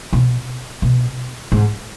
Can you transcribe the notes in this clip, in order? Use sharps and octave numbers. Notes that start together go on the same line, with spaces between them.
B2
B2
G#2